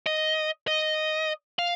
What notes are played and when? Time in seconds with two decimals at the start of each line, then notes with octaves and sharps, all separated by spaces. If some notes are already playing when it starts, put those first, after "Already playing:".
0.06 D#5
0.68 D#5
1.59 F5